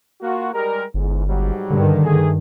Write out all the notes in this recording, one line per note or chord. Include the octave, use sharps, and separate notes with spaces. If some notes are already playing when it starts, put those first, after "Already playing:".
A#3 F4 F#4
G3 G#3 A#4
G1 E2 G#2
G#2 F#3 G3
G2 D3 D#3
A3 G#4